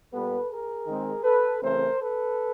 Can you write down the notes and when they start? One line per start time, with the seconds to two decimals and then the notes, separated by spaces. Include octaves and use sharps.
0.12 A#2 G3 B3 A4 B4
0.49 G#4 A#4
0.87 D#3 G#3 C4
1.24 A4 B4
1.61 C#3 E3 A3 C4 A#4 C5
1.99 A4 B4